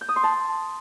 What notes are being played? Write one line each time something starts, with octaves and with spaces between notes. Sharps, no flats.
G6
D#6
C6
A5